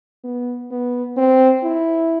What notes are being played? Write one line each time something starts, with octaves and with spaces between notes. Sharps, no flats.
B3
B3
C4
E4